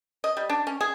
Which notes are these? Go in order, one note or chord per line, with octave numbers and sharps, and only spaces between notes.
D#5
G3
D4
C#4
G#4